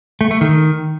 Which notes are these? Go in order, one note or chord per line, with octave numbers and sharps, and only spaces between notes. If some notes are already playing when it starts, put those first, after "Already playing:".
A3
A3
D#3